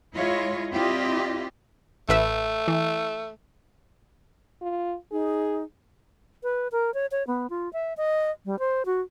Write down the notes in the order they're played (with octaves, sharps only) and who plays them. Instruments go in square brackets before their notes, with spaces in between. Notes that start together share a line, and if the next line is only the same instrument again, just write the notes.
[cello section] G#3 E4 F4 C#5 D#5
C4 E4 F4 G4 D5 D#5
[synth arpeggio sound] A1 B4 E5 [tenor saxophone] A3
[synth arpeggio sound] E3
[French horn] F4
[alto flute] D#4 [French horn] G#4
[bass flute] B4
A#4
C#5
C#5
B3
F4
E5
D#5
G3
C5
F#4